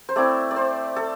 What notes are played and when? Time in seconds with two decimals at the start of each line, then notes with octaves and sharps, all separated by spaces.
0.09 C5
0.16 A3 C4 E4 D5
0.51 D5
0.56 C5
0.96 A4